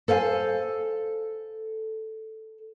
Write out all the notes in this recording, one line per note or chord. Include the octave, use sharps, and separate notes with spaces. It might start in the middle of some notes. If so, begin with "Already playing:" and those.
A4 C5 F5 G#5